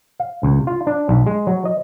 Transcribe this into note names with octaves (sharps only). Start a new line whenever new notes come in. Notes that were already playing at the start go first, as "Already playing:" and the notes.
F5
C#2
F4
D4
B1
G#3
F#3
D#5